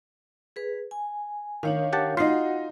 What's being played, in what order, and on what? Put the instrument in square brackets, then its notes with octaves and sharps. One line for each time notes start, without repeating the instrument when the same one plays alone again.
[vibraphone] G#4 B4
G#5
[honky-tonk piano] D#3 [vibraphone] D4 C#5 F5
[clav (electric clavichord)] G4 F#5 A5
[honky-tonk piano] D#4 C7 [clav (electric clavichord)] F4 [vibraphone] F#4 F#5